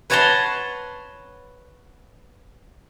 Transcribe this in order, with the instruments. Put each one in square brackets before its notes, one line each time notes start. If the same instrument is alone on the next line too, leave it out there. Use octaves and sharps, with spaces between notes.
[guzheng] B4 C#5 F#5 A5 A#5 C6